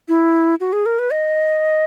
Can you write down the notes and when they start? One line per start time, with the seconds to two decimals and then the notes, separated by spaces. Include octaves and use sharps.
0.08 E4
0.60 F#4
0.73 G#4
0.86 A#4
0.99 B4
1.12 D#5